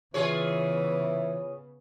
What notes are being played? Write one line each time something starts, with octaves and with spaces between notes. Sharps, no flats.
C#3 E3 B3 F4 G#4 C#5